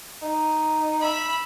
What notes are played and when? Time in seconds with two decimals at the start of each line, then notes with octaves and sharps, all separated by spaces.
0.22 D#4
1.01 E5 B5